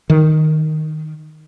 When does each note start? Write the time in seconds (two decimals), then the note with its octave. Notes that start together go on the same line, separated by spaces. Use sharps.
0.10 D#3